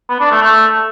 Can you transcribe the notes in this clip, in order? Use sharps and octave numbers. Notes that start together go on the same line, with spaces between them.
B3
D4
A3
A3